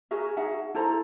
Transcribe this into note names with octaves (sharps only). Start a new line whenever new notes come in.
F#4 G#4 A#4 E5
D#4 G#4 E5 F#5
E4 A4 C5 A#5